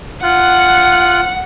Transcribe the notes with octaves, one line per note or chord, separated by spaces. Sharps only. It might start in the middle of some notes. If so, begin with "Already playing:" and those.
F4 F#5 F#6